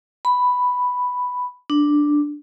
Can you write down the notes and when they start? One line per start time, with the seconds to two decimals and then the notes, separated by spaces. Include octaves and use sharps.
0.25 B5
1.70 D4